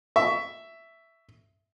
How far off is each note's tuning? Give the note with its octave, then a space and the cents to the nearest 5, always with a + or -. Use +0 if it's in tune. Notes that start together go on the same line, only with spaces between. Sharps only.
E5 +5 C#6 +20